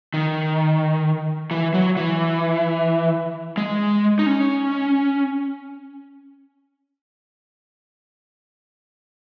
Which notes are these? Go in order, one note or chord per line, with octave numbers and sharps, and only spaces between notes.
D#3
E3
F#3
E3
G#3
D#4
C#4